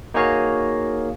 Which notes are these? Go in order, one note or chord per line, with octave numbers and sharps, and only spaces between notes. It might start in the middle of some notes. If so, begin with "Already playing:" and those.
A#3 D#4 F#4 G#4 C#5 F5